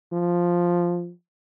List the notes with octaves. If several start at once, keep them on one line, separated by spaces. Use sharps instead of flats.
F3